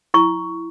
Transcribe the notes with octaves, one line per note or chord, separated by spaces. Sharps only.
E4 C#6